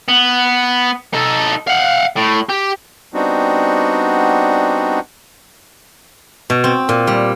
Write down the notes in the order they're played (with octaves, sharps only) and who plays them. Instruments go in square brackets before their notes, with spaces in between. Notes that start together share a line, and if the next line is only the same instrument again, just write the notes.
[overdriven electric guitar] B3
D#4 A4
F5 F#5
A2
G4
[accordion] G3 B3 C4 D4 D#4 F#4
[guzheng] B2
C4
A#2
G3